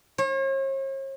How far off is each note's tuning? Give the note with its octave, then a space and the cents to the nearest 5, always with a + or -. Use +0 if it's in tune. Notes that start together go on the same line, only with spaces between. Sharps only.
C#5 -45